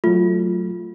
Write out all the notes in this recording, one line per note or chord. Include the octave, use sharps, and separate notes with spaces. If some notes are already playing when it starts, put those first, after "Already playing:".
F#3 A3 F4